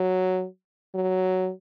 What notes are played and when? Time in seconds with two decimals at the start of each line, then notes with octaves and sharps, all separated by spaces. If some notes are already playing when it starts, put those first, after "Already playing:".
Already playing: F#3
0.95 F#3